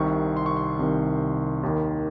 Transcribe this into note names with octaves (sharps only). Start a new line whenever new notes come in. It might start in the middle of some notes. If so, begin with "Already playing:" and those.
Already playing: C2 C3 D#3 C#6
C6
C#6
C6
C2 C3 D#3
D#2 D#3